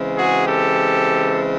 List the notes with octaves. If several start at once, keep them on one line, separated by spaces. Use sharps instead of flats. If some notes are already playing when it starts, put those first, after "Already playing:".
Already playing: C#3 E3 G#3 C4
F#4 G#4
G4 A4